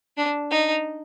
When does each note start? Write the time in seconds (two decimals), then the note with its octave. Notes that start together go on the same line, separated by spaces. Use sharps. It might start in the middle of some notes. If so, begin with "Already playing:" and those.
0.17 D4
0.51 D#4